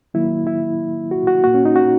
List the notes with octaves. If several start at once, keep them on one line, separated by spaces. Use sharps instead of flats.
D#3 F#3 A#3 E4
E4
F#4
F#4
A#2 A#3 F#4
C#4
D#4
F#4